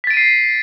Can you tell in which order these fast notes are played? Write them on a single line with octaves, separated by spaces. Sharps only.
B6 A6 D7 D#7 C7